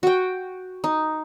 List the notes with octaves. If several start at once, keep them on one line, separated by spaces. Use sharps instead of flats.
F#4 G5
D#4